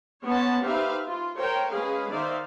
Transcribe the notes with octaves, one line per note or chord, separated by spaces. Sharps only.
B3 C#4 C#5 F#5 A5 C6
D#4 G4 B4 C5 E5 F5
F4
A#4 C5 C#5 G5
G#3 C#4 G#4 B4 F5
D#3 D#4 C5 D5 E5 F5